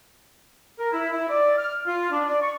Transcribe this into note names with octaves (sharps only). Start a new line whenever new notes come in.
A#4
E4
E4
D5
F6
F4
D4
D5
C#6